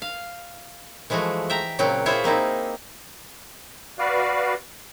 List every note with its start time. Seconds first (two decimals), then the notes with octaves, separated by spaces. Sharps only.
0.02 F5
1.10 E3 F3 G#3 A3 F#4
1.50 E5 G5 A#5
1.79 A#2 C#3 F#3 C4 F#4 G5
2.06 E4 F4 G#4 C5 C#5 E5
2.24 A#3 C4 D#4 E4
3.99 F#4 B4 D5 F5